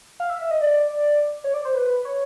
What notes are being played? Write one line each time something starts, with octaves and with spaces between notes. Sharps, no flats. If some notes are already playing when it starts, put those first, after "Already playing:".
F5
E5
E5
D#5
D5
C#5
D5
C5
B4
B4
C#5